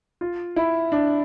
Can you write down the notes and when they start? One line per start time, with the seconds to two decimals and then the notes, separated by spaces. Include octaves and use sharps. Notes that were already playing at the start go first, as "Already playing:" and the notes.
0.21 F4
0.56 E4
0.92 D4